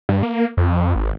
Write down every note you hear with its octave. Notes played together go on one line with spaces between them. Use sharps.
G2
A#3
F2
G#1